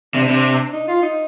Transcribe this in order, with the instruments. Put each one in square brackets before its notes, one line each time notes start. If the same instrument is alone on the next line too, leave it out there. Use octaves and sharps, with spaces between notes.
[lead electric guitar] C3 [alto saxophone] D4
[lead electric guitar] C3
[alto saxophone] D#4
F4
D#4